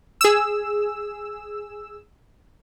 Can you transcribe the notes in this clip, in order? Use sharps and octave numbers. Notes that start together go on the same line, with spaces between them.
G#4 E6